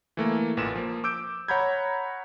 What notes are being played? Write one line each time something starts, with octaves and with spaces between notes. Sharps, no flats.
E3 A3 A#3
A1 A#2 B4 E7
F3 A#3
D6 E6 G6 D7
C#5 F#5 A#5 B5 G6 G#6